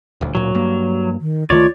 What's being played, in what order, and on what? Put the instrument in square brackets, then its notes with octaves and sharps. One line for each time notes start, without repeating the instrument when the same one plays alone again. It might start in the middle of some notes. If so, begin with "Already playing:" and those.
[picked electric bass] D#1 D2
[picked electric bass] D1 A#2 [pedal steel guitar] F#3
[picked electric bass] G2 A#3
[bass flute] D#3
[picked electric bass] C#2 D#3 A3 [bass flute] F4 [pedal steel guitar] C#5 D5